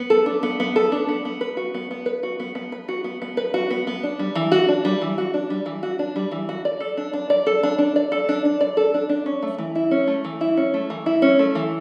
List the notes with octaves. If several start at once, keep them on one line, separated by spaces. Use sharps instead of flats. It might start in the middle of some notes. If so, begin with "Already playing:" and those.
Already playing: B3
A4
D4
B3
B3
A4
D4
B3
B3
B4
F#4
B3
B3
B4
F#4
B3
B3
B4
F#4
B3
B3
B4
F#4
B3
B3
D4
G3
E3
F#4
D4
G3
E3
F#4
D4
G3
E3
F#4
D4
G3
E3
F#4
D5
A4
D4
D4
D5
A4
D4
D4
D5
A4
D4
D4
D5
A4
D4
D4
C#4
A3
E3
E4
C#4
A3
E3
E4
C#4
A3
E3
E4
C#4
A3
E3